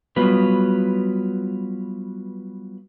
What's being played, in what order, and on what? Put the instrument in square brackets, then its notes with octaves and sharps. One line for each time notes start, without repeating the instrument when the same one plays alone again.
[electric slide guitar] F#3 G3 B3 F4 F#4 B4